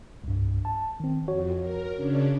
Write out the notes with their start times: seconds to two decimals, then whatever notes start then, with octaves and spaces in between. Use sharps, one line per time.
0.24 C2 G2
0.65 A5
1.00 D#3 C4
1.28 F2 F#4 C#5
1.60 A#4
1.95 C#3 C#4 D4